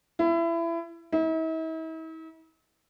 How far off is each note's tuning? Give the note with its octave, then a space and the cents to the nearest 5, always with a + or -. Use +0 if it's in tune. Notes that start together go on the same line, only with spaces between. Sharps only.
E4 +25
E4 -45